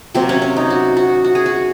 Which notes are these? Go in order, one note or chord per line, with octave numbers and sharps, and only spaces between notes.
C3 F#3 A#3 C4
C#4
C#4
D#4
F#4
F#4
F#4
G#4
F#4